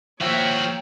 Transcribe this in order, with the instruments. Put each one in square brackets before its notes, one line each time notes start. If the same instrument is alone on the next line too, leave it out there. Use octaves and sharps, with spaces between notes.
[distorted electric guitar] F3 F#4 [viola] A#3 C#5 [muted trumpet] E5 [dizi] G5